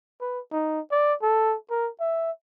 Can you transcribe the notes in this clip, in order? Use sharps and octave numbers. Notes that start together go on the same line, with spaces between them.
B4
D#4
D5
A4
A#4
E5